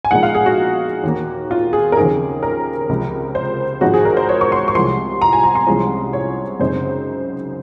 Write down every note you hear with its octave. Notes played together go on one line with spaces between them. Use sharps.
G#5
A#1 A#2 G#3 D#4 F#5
F5
G#4
F#4
D#2 D#3 A#3
F4
G#4
A#4
D#2 C#3 F3 C4 D#4 G#4
A#4
C#2 C3 F3
C5
G#1 G#2 F3 G#3 F#4
G#4
A#4
C5
C#5
C#6
C6
C#6
C2 C3 F3 G#3 C6
A#5
G#5
A#5
C6
C2 C3 F3 G#3 C#4
C#5
F#2 C#3 G#3 C4 D#4 C5